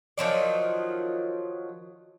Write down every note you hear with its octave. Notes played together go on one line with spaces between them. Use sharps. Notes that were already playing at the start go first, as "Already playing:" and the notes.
D#3 F3 F#3 D5